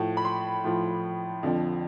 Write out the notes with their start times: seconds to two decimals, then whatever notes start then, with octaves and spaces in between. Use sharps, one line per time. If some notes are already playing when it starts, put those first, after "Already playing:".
Already playing: A2 F3
0.17 B5
0.25 C6
0.64 A2 F3
1.43 F2 D3 F3